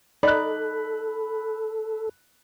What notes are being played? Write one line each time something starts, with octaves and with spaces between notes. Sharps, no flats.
D#4 A4 D5 B5 F#6